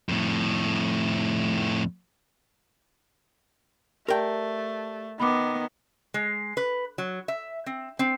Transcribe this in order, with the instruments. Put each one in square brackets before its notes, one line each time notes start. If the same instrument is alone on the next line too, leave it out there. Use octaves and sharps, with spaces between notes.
[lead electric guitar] F2 A2
[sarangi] A3 [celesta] G4 D5 A5 [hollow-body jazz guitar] A#4 G5
[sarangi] D#3 [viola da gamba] B3 [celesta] B5 D6
[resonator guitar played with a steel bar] G#3
B4
F#3
E5
C4
C4